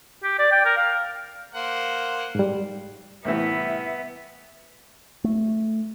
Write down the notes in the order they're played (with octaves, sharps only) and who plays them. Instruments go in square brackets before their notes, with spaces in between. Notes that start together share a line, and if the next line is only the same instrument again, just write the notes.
[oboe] G4
D5
G5
A#4
F5
[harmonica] A#3 C5 F#5
[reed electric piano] G#2 G3
[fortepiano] C2 A2 E3 [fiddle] B3 [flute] E5
[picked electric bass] A3